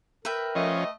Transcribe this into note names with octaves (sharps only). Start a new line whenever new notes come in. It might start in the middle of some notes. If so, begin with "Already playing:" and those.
A#4 B4 E5 G5
F3 A3 C#4 D#5